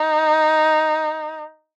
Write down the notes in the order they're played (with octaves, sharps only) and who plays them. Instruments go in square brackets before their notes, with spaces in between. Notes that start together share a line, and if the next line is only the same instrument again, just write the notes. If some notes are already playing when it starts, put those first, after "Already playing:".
Already playing: [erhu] D#4